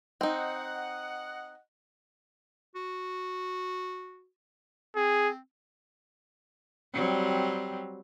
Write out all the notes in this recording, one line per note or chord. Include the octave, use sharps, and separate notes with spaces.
C4 D#4 D#5 F#5
F#4
C4 G#4
F#3 G3 C4